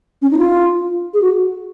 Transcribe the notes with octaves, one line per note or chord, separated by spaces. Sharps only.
C#4
D#4
F4
G#4
F#4